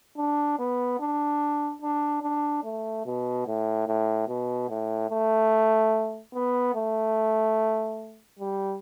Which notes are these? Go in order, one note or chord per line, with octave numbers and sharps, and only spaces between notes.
D4
B3
D4
D4
D4
A3
B2
A2
A2
B2
A2
A3
B3
A3
G3